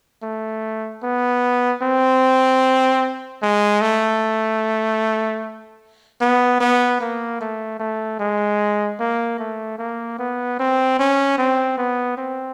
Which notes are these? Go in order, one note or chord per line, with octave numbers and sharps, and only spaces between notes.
A3
B3
C4
G#3
A3
B3
B3
A#3
A3
A3
G#3
A#3
A3
A#3
B3
C4
C#4
C4
B3
C4